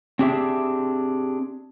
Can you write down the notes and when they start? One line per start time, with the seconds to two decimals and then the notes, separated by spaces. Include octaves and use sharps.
0.19 C4 D4 G4 G#4 E5